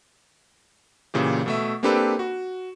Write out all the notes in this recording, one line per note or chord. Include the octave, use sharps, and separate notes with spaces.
A#2 C#3 E3 G4
B2 A3 E5
A#3 C4 D4 G4 A4 B4
F#4